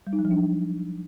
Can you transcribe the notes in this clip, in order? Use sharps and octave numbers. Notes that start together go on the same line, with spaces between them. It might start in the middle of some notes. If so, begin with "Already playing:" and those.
G3
D#4
F#3
F3
D4